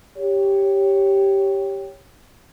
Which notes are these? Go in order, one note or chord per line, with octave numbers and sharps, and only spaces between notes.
G4 C#5